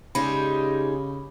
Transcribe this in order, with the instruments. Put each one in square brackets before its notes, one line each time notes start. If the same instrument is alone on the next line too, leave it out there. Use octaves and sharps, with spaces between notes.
[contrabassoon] C#3 [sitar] G3 [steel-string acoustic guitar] G#3 D#4 [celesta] B5